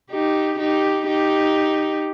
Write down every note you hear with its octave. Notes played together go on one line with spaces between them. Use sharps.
D#4 G4
D#4 G4
D#4 G4